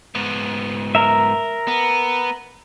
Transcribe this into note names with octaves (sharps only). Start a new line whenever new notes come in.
G#2 B3
A#4 E5
B3